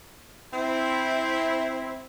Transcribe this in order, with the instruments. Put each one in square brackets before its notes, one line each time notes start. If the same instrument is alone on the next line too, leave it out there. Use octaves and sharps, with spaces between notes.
[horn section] C4 E4